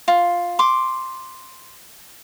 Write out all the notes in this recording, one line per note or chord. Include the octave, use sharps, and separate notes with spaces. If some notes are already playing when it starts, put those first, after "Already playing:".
F4
C6 D6